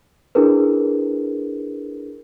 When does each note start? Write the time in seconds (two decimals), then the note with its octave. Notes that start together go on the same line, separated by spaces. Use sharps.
0.35 D4 E4 G#4 A#4 B4